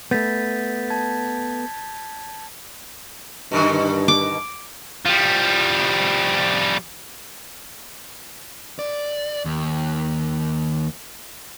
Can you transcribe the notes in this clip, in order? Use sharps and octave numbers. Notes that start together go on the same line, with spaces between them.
A3 B3 G6 A6 B6
A5 G#6
G2 B2 D3 D#3
D6
F3 G3
D5
D#2